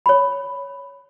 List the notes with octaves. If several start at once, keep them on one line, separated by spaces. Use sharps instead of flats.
C#5 B5